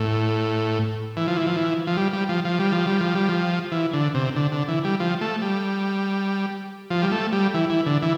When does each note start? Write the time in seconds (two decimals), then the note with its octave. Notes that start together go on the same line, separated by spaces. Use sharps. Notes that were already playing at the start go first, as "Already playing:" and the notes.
Already playing: A2
1.17 E3
1.27 F3
1.37 E3
1.47 F3
1.56 E3
1.87 F3
1.97 G3
2.13 G3
2.29 F3
2.45 F3
2.59 G3
2.72 F3
2.87 G3
3.00 F3
3.15 G3
3.28 F3
3.72 E3
3.93 D3
4.15 C3
4.36 D3
4.52 D3
4.68 E3
4.84 G3
5.00 F3
5.21 A3
5.42 G3
6.90 F3
7.02 G3
7.12 A3
7.33 G3
7.54 E3
7.70 E3
7.86 D3
8.02 E3